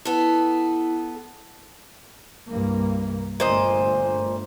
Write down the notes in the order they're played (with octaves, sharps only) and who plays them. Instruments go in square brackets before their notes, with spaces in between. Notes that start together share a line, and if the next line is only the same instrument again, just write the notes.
[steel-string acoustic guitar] B3 A4 [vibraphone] E4
[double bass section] C2 G2 A#3
[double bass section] G1 G2 A3 [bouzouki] A#2 C5 D#5